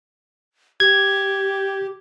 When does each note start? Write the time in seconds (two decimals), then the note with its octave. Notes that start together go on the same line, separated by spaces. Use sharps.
0.80 G4 G#6